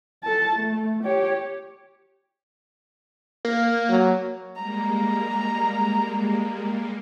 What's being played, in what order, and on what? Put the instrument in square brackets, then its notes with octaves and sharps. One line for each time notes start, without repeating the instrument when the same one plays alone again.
[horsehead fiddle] A4 A5
A3
G4 C#5
[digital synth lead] A#3
[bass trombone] F#3
[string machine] G3 G#3 A#3 [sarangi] A#5